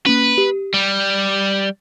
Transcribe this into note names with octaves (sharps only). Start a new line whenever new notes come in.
A#3 C#4 B4
G4
G3